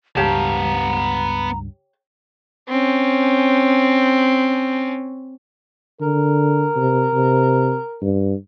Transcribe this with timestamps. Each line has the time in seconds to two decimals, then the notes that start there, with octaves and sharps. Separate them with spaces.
0.17 C#2 G2 B3 G4 C#5 F5 A5 A#5
2.68 C4 C#4
6.01 D3 A#4
6.76 C3
7.13 C3
8.02 G2